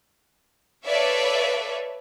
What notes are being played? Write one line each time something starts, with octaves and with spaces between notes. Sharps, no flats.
A4 B4 C#5 D5 E5 F5